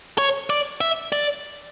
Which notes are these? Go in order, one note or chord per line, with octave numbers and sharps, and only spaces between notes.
C#5
D5
E5
D5